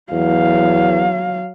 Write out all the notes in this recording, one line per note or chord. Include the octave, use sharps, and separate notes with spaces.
E2 F#3 F5